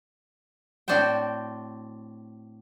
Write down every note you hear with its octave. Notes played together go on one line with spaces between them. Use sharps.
A2 C4 D4 F#4 C5 G5